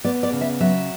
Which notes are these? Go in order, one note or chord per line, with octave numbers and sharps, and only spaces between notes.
B3 D5
D5
C#3
E5
F#3 E5